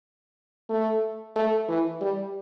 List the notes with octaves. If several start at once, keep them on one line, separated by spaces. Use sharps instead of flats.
A3
A3
E3
G3